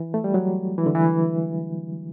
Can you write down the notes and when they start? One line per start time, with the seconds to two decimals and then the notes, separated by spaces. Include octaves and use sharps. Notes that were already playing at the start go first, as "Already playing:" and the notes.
Already playing: E3
0.14 A3
0.24 G3
0.34 F#3
0.78 E3
0.86 D3
0.95 E3